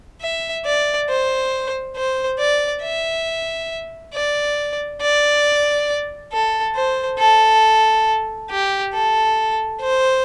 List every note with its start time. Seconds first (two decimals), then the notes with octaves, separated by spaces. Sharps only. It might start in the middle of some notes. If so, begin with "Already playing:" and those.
0.22 E5
0.66 D5
1.09 C5
1.96 C5
2.39 D5
2.83 E5
4.14 D5
5.02 D5
6.32 A4
6.76 C5
7.19 A4
8.51 G4
8.94 A4
9.81 C5